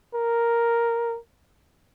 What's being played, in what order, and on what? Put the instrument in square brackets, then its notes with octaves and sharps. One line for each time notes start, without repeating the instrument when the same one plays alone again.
[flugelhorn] A#4